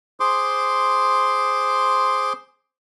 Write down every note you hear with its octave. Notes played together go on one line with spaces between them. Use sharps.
G#4 C5 C6 D6